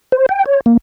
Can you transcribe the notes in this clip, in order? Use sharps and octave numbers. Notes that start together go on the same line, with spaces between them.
C5
G5
C#5
A#3